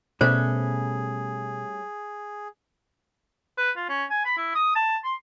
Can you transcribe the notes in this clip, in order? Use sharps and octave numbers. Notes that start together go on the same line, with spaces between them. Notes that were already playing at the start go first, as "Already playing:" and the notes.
B2 G3 A3 C#4 G#4 C5
B4
F4
C#4
G#5
B5
E4
D#6
A5
C6